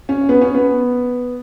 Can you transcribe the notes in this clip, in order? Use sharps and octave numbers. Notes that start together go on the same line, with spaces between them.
C#4
B3
C#4
B3